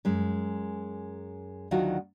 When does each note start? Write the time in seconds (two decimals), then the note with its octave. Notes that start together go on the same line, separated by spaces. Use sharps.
0.05 F#2 G#3
1.71 D2 D#3 F#3 F4 F#4 F#5